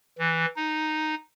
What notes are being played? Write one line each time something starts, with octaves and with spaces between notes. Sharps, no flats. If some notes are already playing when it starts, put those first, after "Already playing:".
E3
D#4